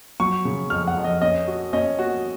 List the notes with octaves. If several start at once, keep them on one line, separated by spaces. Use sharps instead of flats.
F#3 C#6
C#3
F2 F6
F#5
F2
D#5
C#4 D#5
F#4
C#4 D#5
F#4